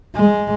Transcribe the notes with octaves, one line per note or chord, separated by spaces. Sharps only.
G#3